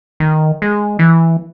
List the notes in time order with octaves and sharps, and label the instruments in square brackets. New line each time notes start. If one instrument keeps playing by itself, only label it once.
[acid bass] D#3
G#3
E3